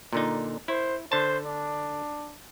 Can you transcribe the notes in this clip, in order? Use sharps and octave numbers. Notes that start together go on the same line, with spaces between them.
A#2 D3 D#4
E4 C5
D3 C5 A5
D4